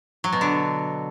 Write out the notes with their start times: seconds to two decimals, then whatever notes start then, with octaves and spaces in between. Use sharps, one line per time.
0.24 F#3
0.33 B2
0.41 D3